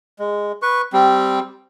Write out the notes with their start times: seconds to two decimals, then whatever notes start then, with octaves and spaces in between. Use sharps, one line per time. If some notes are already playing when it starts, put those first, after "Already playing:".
0.19 G#3
0.62 B4 C#6
0.93 G3 C4